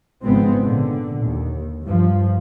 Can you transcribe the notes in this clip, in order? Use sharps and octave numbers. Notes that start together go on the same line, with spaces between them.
G#1 C#3 F3 G#3 B3 C4
A#2 D3
D#2
G2 F3